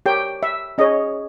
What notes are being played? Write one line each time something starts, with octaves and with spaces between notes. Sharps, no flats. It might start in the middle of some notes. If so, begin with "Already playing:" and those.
G4 A#4 C#5 G5
E5
C#4 G#4 C#5 D#5